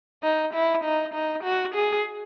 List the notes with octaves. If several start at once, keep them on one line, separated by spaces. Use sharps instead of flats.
D#4
E4
D#4
D#4
F#4
G#4